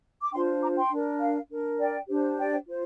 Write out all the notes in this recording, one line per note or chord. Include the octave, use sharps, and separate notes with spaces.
D6
D4 F4 C5 G5 C6
A#5 D6
G5 C6
D4 A#4
F5
D4 A#4
D5 G5
D4 G4 C5
D5 G5
F4 C5